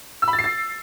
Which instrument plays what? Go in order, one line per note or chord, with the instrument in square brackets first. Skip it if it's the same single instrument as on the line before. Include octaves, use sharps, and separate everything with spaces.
[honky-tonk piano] E6
B5
A6
C7
A6